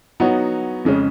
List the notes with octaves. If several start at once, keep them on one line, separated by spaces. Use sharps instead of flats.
F#3 B3 D#4 F#4 C#5
F2 C#3 G#3 C#4